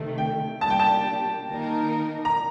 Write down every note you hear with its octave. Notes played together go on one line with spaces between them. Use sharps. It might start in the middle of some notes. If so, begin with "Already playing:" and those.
Already playing: C3 D#3 A3
G5
G3 A#3 D4 G4 A5
G5
A5
D#3 A#3 D#4 A#4
A#5